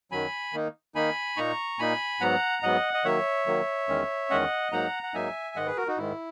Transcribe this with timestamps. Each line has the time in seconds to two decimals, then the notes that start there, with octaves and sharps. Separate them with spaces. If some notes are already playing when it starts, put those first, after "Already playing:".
0.11 F#2 D#3 F#3 G#5 B5
0.53 D#3 A#3 D#4
0.95 D#3 A#3 D#4 G#5 B5
1.37 A#2 A#3 D#4 A#5 C#6
1.79 A#2 A#3 D#4 G#5 B5
2.20 G#2 F#3 B3 F#5 A#5
2.63 G#2 F#3 B3 D#5 F#5
2.94 D#5
3.04 D#3 F#3 A#3 C#5 E5
3.46 D#3 F#3 A#3
3.88 E2 D#3 G#3 C#4
4.30 E2 D#3 G#3 C#4 D#5 F#5
4.72 G#2 F#3 A#3 D#4 F#5 A#5
5.03 F#5
5.14 G#2 F#3 A#3 D#4 E5 G#5
5.56 G#2 D#3 G#3 D#5 F#5
5.66 G#4 B4
5.77 F#4 A#4
5.87 D#4 F#4
5.98 G#2 D#3 G#3 E4